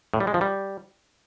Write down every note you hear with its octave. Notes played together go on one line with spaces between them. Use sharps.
A2
G3
G#3
F3
G3